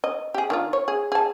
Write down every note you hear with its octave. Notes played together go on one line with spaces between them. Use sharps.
D#5
G4 G#4
D#3 D4 F4
C#5
G#4
G#4 A5